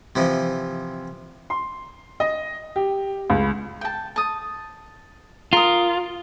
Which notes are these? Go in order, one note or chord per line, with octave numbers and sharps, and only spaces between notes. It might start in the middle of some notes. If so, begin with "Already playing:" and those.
C3 E3 F3
C6
D#5
G4
C#2
G5 A5
A5 D#6
F4 A#4 D#6